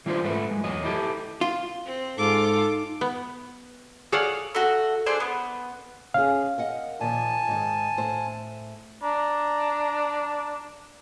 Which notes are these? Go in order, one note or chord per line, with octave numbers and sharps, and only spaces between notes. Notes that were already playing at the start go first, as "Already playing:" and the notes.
E3 G3 D4 F4 A#4 C5
G#2 A3 B4
F#2 G#3
E2 F#3 D#5
E4 G4 A4
F4
C4
G#2 D#4 F4 A4 D6
B3
G#4 A4 C#5 D5 F5 F#5
A3 F#4
D4 G#4 A4 C5
B3
C#4 G#4 F5
A#4 D#5 F#5
A#2 D#3 F3 G#5 A5
G#2 D#3
A2 C5
D4 A#5